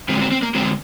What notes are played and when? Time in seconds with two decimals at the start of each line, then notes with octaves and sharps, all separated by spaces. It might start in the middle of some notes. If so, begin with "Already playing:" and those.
0.09 D3 G#3 C4
0.21 C4
0.32 C4
0.42 A#3
0.55 D3 G#3 C4